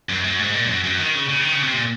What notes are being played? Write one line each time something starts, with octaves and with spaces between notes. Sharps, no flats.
F#2
F#2
G#2
A#2
G#2
F#2
F#2
D#3
C#3
C#3
D#3
C#3
C3
A#2